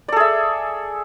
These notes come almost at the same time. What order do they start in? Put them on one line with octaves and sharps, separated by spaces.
D5 A4 G#4 E5